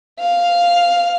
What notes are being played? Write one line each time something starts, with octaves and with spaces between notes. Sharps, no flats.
F5